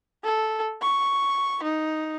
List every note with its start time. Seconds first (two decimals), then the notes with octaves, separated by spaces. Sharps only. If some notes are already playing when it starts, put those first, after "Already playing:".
0.24 A4
0.81 C#6
1.63 D#4